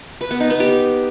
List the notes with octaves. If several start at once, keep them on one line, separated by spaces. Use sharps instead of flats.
B4
B3
D#4
B3
G4